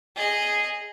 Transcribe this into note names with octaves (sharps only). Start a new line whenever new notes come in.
G#4 D#5